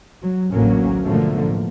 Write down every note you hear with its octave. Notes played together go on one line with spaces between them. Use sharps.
F#3
A1 D2 A2 F#3 A#3 C#4
G#2 B2 D3 F3 A3 A#3
A2